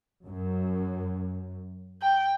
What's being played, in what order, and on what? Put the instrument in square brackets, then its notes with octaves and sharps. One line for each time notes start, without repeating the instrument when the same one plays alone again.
[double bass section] F#2
[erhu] G5